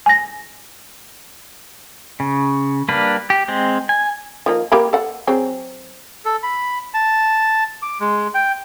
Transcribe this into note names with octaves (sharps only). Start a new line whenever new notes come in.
G#5 A#6
C#3
G3 A#3 D4 B4
G4
G#3 C4
G#5
F3 A#3 D#4
A#3 G4 B5
A4 F#5
F#3 C4 G#4
A4
B5
A5
D6
G#3
G5